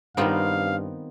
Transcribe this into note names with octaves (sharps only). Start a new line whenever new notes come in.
G2 D#3 G3 B3 C4 D#4 F4 F5